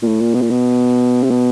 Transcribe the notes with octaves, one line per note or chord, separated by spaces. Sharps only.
A#2
A2
A#2
B2
A#2
B2
C3
B2